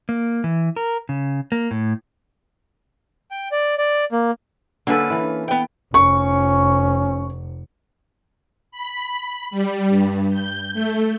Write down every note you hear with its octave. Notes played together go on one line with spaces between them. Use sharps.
A#3
E3
A#4
C#3
A#3
A2
G5
D5
D5
A#3
D3 A#3 C#4 A4 B4
E3
B3 G5
F1 C#4 C#6
B5
G3
G2
G6
A3